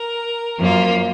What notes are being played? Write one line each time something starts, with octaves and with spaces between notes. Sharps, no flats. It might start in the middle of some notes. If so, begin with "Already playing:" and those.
Already playing: A#4
F#2 F3 A#3 F4